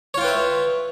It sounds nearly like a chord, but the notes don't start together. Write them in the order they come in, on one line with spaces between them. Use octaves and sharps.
C#5 F4 G5 B4 E5